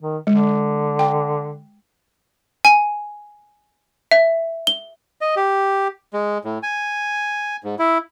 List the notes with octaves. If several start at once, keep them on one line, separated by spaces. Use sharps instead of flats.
D#3
D3 G#3
G5
G#5
E5
G7
D#5
G4
G#3
A2
G#5
G#2
E4